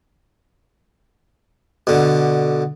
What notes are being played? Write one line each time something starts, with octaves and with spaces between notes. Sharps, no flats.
B2 D3